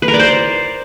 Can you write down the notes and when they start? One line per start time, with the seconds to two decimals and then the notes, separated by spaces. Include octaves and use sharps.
0.02 B4
0.08 A#4
0.14 D5
0.19 C5